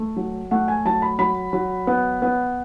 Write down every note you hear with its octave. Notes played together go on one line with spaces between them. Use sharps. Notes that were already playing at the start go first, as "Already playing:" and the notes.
Already playing: A3
F#3
A3 F#5
G#5
F#3 A5
B5
F#3 B5
F#3
B3
B3